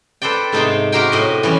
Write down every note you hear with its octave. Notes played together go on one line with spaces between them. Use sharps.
A4 B4 C5 D5 G5
G#2 C3 A3 D#4 C5 G5
F#4 G4 A#4 C5 G5
A2 D#5
E3 G3 C#4